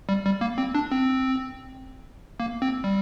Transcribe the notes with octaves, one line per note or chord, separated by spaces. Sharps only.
G3
G3
A#3
C4
D4
C4
A#3
C4
G3